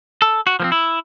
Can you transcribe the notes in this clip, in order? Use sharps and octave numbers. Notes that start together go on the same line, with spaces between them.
A4
F#4
F3 A#3 C4
E4